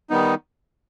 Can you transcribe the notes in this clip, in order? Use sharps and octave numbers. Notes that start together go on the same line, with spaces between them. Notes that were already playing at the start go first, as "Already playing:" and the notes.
D#3 G3 B3 D#4